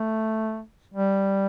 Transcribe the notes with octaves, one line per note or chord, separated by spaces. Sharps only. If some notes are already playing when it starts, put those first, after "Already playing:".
Already playing: A3
G3